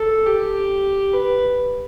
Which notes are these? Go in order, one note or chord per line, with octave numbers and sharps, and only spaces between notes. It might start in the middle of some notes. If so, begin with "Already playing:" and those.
Already playing: A4
G4
B4